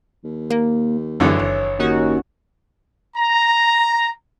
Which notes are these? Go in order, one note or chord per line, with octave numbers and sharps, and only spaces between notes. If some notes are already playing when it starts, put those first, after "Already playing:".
D#2
A#3
G#1 F#2 D3 E3 C#5
F#1
D#2 C#4 D#4 F#4
A#5